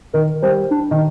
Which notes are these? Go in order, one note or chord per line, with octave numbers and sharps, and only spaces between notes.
D#3 A#4
G3 C5
D4
D#3